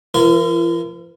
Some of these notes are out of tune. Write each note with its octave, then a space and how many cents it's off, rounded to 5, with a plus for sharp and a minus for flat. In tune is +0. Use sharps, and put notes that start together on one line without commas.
E3 +45 F4 -45 A#4 +0